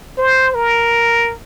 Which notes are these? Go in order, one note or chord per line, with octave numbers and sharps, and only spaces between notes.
C5
A#4